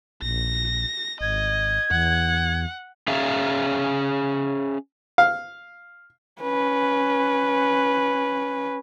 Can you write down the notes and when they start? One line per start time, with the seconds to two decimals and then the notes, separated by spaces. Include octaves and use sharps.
0.22 A#1 A#6
1.21 G#1 D#5 G#6
1.91 E2 F#5
3.08 C#4 G#4 E5 F5
5.18 F5
6.42 C#4 B4